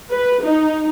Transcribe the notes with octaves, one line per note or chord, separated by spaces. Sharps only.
B4
D#4